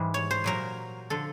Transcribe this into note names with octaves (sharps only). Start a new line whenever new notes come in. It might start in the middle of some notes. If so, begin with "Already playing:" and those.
Already playing: G#2 E3 G3
C#5
C5
A#2 F#3 A#4
D3 F3 A4